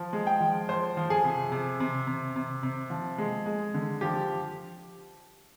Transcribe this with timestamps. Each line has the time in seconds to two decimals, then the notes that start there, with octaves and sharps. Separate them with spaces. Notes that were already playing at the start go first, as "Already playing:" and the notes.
Already playing: F3
0.13 G#3
0.27 G5
0.41 F3
0.69 F3 C5
0.97 F3
1.10 G#4
1.24 C3
1.52 C3
1.80 C3
2.07 C3
2.36 C3
2.63 C3
2.90 F3
3.18 G#3
3.46 G#3
3.74 D3
4.01 F3 G4